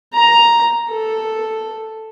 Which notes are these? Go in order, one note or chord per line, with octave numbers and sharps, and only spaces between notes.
A#5
A4